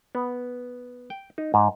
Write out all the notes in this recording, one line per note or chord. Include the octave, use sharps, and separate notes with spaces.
B3
G5
D#4
G#2